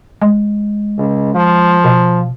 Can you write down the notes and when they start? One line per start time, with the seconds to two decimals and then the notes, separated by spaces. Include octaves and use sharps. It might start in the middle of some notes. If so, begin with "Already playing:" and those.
0.22 G#3
0.98 C#2
1.34 F3
1.84 B2